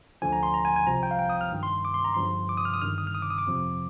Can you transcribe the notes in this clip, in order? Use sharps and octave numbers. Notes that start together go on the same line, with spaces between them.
D2 D3 F3 G#5
A#5
C6
A#5
G#5
G#5
C2 C3 F3 A#5
G5
F5
G5
D#6
F6
G1 G2 D#3
C6
D6
C6
A#5
G1 G2 F3 C6
D6
D#6
F6
D#6
G1 G2 D#3 F6
D#6
F6
D#6
D6
D#6
D6
F2 C3 F3